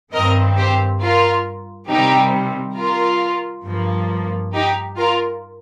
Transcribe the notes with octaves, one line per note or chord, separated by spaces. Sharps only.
G2 D#3 C4 A#4 D#5
G4 C5
F4 A#4
C3 D#3 G3 C4 D#4 G4
F4 A#4
G2 F3 A#3
D#4 G4
F4 A#4